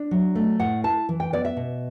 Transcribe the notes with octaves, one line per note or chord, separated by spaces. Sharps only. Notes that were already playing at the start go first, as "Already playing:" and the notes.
Already playing: D4
F#3
A3
A2 F#5
E4 A5
E3
G5
B3 D5
E5
B2